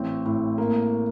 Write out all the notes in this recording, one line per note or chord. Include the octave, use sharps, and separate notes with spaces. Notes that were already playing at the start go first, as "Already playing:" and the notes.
Already playing: A1 C4
A2
A#3